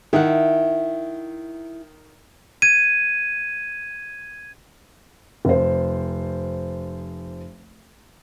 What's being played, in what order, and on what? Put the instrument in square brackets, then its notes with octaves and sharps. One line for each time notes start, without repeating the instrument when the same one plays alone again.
[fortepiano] D#3 [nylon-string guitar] E4 F#5
[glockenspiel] G#6 D#7
[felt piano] F1 C5